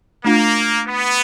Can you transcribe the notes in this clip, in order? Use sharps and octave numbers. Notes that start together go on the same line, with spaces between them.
A3 A#3 D4 F4
B3